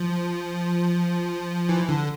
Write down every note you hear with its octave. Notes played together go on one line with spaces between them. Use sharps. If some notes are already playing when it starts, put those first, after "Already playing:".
Already playing: F3
E3
D3